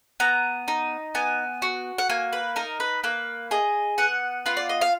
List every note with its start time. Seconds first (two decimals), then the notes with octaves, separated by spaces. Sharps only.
0.20 B3 A#5
0.68 D#4
1.15 B3 G#5
1.62 F#4
1.98 F#5
2.10 A#3 G#5
2.33 B4
2.56 D#4 A#4
2.80 B4
3.04 A#3 B4
3.51 G#4 D#5
3.98 B3 F#5
4.46 F4 B4
4.57 D5
4.69 D#5
4.81 F5